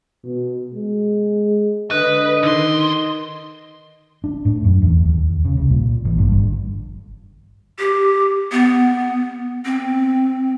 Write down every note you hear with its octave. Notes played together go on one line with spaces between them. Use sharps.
B2
G#3
D3 B4 D#5
D3 D#3 C6
D4
A2
F#2
E2
D#2
C#3
C2
A#2
A1
G2
G1
G4
B3
C4